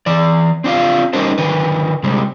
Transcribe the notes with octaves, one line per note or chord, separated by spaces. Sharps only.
E3 D5
C4 D4 F4 F5
G3 C#4 D#4 A4 A#4 C5
D3 D#3 B4
C3 G3 G#3